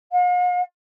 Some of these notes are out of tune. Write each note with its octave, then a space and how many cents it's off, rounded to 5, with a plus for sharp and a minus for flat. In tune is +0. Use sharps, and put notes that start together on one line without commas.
F5 +45